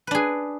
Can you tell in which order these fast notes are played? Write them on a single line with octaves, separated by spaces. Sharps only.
B4 D4 G#4